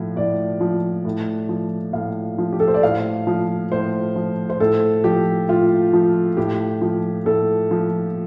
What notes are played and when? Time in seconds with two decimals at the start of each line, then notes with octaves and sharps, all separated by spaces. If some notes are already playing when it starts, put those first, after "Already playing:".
Already playing: A2 F3
0.16 A2 D5
0.61 F3
1.05 A2
1.49 F3
1.93 A2 F5
2.38 F3
2.52 G4
2.60 A4
2.68 C5
2.74 D5
2.83 A2 F5
3.27 F3
3.72 A2 C5
4.16 F3
4.50 C5
4.60 A2 A4
5.04 F3 G4
5.49 A2 F4
5.93 F3
6.37 A2 G4
6.81 F3
7.26 A2 A4
7.71 F3